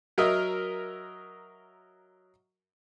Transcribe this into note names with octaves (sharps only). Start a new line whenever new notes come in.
F#3 A#4 D#5 E5